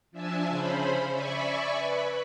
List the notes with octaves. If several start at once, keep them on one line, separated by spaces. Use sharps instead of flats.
F3 D4 E5 G#5 A5 E6
C#3 C#4 C5 B5
D5 E5 G#5 B5 C#6
B4 B5